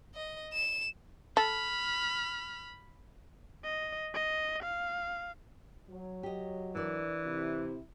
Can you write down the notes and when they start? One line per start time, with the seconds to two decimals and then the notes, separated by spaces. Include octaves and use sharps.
0.14 D#5
0.53 E7
1.37 A4 B5 F6
3.64 D#5
4.14 D#5
4.63 F5
5.90 F#3
6.23 G4 D#5
6.75 E3 D4 A#4 D5
7.25 C3 E4